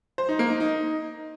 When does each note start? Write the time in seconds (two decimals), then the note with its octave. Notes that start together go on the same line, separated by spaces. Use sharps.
0.18 C5
0.29 D#4
0.39 A#3
0.50 D#4
0.60 D#4